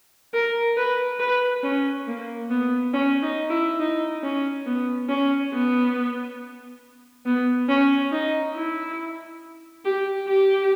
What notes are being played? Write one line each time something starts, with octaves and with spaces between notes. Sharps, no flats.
A#4
B4
B4
C#4
A#3
B3
C#4
D#4
E4
D#4
C#4
B3
C#4
B3
B3
C#4
D#4
E4
G4
G4